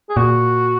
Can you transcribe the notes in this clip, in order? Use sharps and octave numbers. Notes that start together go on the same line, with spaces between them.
G#4
A#2 F#4